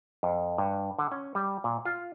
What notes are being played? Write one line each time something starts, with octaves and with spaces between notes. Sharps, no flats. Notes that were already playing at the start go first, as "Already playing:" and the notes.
F2
G2
D3
C#4
G3
A#2
F4